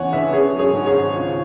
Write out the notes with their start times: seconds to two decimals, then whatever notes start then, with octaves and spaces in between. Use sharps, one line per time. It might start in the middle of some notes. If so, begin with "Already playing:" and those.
Already playing: E2 C#3 E3 C#5 F#5 G#5
0.13 E1 B4 E5
0.33 C#4 G#4 C#5
0.53 F#3
0.59 G#4 C#5
0.73 G#2
0.86 G#4 C#5
0.93 G#1
1.13 C#2